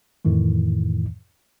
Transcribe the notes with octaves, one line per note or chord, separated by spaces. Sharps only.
F2 A2 D#3 E3